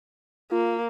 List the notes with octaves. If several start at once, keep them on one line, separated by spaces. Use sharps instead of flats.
A#3 F4